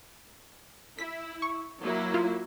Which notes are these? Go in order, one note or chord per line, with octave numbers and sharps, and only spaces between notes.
E4 B6
C#6
F#3 A#3 E4
F4